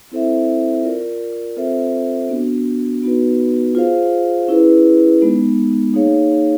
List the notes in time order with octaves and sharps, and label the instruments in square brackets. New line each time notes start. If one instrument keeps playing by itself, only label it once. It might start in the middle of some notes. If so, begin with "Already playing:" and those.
[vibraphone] C4 E4 A4 C5 E5
F4 A#4 D5
C4 F4 A4 C5 E5
B3 D4 F#4
B3 D#4 F#4 B4
F4 G#4 C5 F5
C#4 E4 G#4 B4
G#3 B3 D#4
A#3 D#4 G#4 C#5 F5